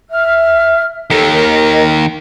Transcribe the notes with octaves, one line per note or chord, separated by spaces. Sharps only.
E5 F6
D#2 D#3 A4
A#4 D#5